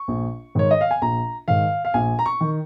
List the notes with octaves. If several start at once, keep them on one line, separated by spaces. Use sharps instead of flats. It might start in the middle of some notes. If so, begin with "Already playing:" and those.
Already playing: C#6
A#1
G#2 D#3 C#5
D#5
F5
G#5
A#1 A#5
G#2 D#3 F5
F5
A#1 G#5
A#5
C#6
D#3